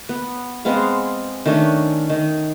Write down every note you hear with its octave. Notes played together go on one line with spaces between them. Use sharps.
B3
G#3 B3 C4 F5
D#3 A3 C#4 D4
D#3